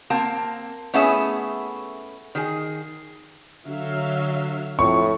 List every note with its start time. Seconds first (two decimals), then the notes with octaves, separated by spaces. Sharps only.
0.10 A#3 C4 G5 A5
0.94 A3 B3 C#4 E4 G#4 E5
2.35 D#3 G#4
3.67 D3 F#3 E5 F5
4.79 F2 A2 C#6